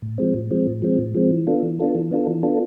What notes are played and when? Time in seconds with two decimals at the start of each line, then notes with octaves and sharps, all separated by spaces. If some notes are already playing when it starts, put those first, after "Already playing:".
0.02 A2
0.18 F3 G#3 C4
0.34 A2
0.51 F3 G#3 C4
0.67 A2
0.82 F3 G#3 C4
0.98 A2
1.15 F3 G#3 C4
1.31 E3
1.47 B3 D4 F4 A4
1.63 E3
1.79 B3 D4 F4 A4
1.95 E3
2.11 B3 D4 F4 A4
2.27 E3
2.43 B3 D4 F4 A4